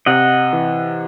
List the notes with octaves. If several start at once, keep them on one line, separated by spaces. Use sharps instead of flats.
C3 D#5 F#5
E3